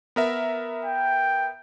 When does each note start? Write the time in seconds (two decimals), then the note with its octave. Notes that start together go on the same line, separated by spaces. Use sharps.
0.16 B3 A#4 E5
0.85 G5